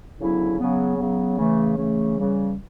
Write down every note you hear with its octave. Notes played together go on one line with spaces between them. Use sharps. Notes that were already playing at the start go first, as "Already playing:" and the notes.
D2 C#3 F#3 B3 E4
C#3 F#3 B3
C#3 F#3 B3
C#3 E3 A3
C#3 E3 A3
C#3 E3 G3